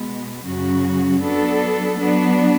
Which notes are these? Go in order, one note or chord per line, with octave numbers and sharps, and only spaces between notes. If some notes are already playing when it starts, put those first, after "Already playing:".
Already playing: B2 G#3 B3
F#2 C#3 F#3 C#4 F#4
F#3 B3 D4 A4
F#3 B3 D4